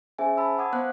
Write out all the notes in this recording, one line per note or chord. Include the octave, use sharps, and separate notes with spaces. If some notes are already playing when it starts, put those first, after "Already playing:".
C#4 G#4 C5 E5 G#5
A5 B5 E6
F#5 D6 D#6 G#6
B3 C5 F5 F#6